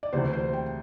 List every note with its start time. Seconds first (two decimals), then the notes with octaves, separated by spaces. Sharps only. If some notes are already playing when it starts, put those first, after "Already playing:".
0.03 D5
0.13 D2 C3 E3 C5
0.33 C5
0.53 G5